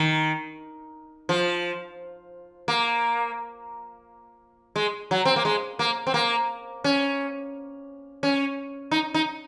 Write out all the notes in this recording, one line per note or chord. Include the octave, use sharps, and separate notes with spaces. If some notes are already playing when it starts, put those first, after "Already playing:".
Already playing: D#3
F3
A#3
G#3
F#3
C4
A#3
G#3
A#3
C4
A#3
C#4
C#4
D#4
D#4